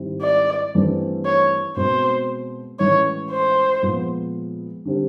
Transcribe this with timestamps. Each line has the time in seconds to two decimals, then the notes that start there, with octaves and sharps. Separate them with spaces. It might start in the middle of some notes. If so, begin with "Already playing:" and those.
Already playing: G#2 D#3 G3 C4 E4
0.22 D5
0.74 G2 E3 A3 C4
1.25 C#5
1.76 B2 G#3 C4 C5
2.79 A2 E3 G#3 C#4 C#5
3.31 C5
3.82 A#2 F3 G#3 B3
4.85 D3 G3 C4